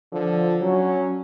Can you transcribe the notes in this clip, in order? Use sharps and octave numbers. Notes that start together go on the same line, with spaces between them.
D3 F3
F#3 C#4